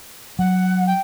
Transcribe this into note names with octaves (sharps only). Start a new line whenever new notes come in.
F#3 F#5
G5